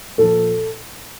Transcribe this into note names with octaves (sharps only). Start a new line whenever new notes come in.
A#2 F3 A4